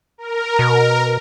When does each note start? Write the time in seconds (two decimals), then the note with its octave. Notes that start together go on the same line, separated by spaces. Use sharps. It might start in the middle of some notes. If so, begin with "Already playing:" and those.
0.18 A#4
0.59 B2